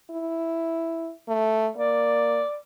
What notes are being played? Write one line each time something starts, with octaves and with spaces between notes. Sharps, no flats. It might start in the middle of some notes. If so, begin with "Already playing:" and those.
E4
A3
A#3 D5